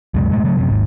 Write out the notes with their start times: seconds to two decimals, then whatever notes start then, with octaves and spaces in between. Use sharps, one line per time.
0.14 C#2 F#2 C3 G#3
0.31 E1 A2 G#3 A3
0.44 C#3 F#3 A3
0.58 F#2 C3
0.70 G#1 D#2 G#2